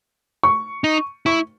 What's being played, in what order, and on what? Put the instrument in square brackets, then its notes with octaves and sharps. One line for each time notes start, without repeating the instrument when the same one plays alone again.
[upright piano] C#6
[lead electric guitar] D#4
[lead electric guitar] E4 [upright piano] C#6